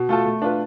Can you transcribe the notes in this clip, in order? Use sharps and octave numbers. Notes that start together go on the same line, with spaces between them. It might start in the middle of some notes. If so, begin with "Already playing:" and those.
Already playing: B2
A3 F4 A4
A3
D4 F4 B4